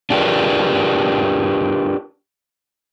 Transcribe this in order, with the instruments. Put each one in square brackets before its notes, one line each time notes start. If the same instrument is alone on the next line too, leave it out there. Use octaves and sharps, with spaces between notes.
[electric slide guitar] D4 F4 G4 G#4 A#4 B4